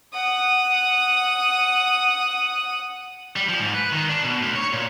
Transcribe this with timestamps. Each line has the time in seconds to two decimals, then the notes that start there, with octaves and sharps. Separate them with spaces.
0.13 F#5 D#6
3.36 G3
3.49 F3
3.60 G#2
3.74 B4
3.92 D#3
4.09 D4
4.24 B2
4.42 D2
4.56 C#5
4.73 A#2